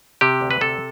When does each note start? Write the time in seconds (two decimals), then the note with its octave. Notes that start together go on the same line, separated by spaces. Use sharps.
0.21 C3 G4
0.41 D2
0.51 B4
0.61 C3 A4